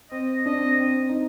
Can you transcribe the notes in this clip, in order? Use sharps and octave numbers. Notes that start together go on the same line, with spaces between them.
C4 D#5
D4 D#5
C4
C4
D#4